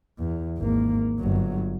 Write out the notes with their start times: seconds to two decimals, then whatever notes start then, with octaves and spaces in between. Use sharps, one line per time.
0.19 E2
0.58 G#1 A#3
1.19 G1 F#3